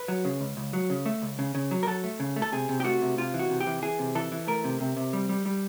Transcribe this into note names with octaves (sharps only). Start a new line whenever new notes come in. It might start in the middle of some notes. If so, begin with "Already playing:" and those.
Already playing: B4
F#3
C#3
C#2
C#2
F#3
C#3
A3
C#2
C#3
C#3
F#3
A#4
F#3 A4
A3
C#3
A3
A4
C3 G#4
C3
G4
A3 F#4
C3
C3 F4
E3
F#4
C3
G4
E3
E3 G#4
C3
E3 A4
E3
A3 A#4
C3
C3
C3
G3
G3
G3